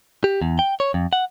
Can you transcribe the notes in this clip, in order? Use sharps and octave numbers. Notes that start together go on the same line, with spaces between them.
G4
E2
G5
C#5
F2
F#5